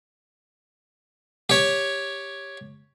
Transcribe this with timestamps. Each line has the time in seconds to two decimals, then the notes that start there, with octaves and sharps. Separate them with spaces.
1.50 G4 C#5